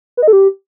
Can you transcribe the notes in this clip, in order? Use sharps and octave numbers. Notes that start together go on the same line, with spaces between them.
B4
D#5
A4
G4